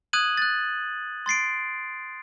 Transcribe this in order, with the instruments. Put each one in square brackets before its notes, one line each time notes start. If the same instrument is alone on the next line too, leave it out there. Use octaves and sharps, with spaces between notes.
[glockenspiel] D#6 F#6 G#6 D#7 F#7
F#6 A6
C6 A6 C7 D7